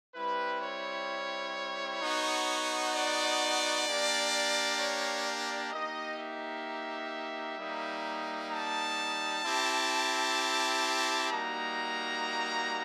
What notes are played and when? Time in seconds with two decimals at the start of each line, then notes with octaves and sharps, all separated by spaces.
0.15 G3 C4 E4 B4
0.62 C#5
2.01 B3 D#4 F#4
2.94 D5
3.87 A#3 D4 G4
4.80 C#5
5.26 D5
5.72 A#3 D#4 G4 D#5
6.19 E5
7.59 G3 A#3 D#4
8.52 A5
9.45 C4 E4 G4
11.30 G3 A#3 D#4 F#4 A#5